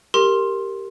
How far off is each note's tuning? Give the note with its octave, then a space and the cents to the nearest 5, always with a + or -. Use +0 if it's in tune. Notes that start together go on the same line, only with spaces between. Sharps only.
G4 +0 A#4 -15 C6 +10